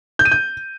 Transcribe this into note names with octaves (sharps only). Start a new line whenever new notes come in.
G6
D#7
G6